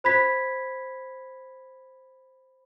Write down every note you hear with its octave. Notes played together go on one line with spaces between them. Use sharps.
C5 B5 G#6 B6